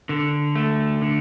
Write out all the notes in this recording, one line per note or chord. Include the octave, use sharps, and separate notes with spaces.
D3
A3
D3